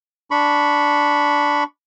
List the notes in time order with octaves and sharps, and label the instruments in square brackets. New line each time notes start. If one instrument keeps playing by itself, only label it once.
[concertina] D4 B5 C#6